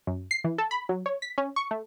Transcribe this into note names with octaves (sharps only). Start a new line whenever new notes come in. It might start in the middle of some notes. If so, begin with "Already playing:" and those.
F#2
C7
E3
A4
B5
F#3
C#5
B6
C#4
C#6
A3